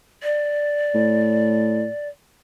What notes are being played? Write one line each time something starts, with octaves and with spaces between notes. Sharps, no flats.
D5
A2